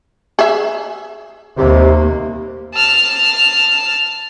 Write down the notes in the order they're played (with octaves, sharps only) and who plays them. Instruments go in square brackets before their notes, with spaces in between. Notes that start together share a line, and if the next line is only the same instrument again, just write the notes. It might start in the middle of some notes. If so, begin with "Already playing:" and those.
[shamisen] G#4 E5
[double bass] D#2 A#3 [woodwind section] C3
[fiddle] A5 F6